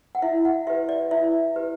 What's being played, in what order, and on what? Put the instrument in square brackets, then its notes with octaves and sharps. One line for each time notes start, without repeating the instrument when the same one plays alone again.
[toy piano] F#5
E4 E5
F#5
G4 B4 E5
D5
E4 E5
G4 B4